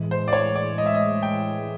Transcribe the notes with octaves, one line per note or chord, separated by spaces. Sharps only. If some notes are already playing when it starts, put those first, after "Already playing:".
Already playing: A2 E3 G#3
C5
D5
C#5
D5
D#5
E5
D#5
G5